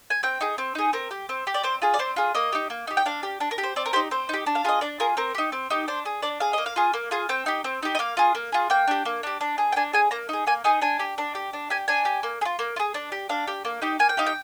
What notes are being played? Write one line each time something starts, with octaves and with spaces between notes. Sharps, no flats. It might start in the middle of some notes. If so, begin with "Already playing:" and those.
G#5
C4 G5
D#4 G#4
C4
D#4 G#4
C4 A#4
G4
C4
G4
D5
C4 C5
F4 G#4
D5
C4 C5
F4 G#4
A#3 D#5
D#4 G4
A#3
D#4 G4
G5
D4 F5
G4
D4
A#4
G4
C5
C4 D5
A#4
D#4 G4 C5
C4 C5
D#4 G4
D4
F5
F4 G#4 D#5
D4 D5
F4 G#4 A#4
C4 A#4
D#4 G4
C4
D#4 G4
D4 C5
G#4
D4 D5
G#4 F5
A#3 D#5
F5
F4 G#4
A#3
F4 G#4
C4 G5
D#4 G4
C4
D#4 G4
D#5
A#3 F5
F4 G#4
A#3
F4 G#4
A#3 G5
D4 G4
A#3
D4 G4
D4
G#4
G5
D4 G#5
G#4 G#5
A#3 A#5
D#4 G#4
A#3 G#5
D#4 G#4 G#5
D4 G#5
G4
D4
G4
D4
G4 G#5
D4 G#5
G4
A#3
G#4
F4
A#3
F4
G#4
D4
G4
D4 F5
G4
A#3
D#4 G4
A#3 G#5
G5
D#4 G4 F5
G5